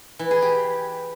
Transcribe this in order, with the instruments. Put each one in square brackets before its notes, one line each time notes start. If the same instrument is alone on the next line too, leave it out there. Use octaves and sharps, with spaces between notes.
[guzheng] E3
G#4
G4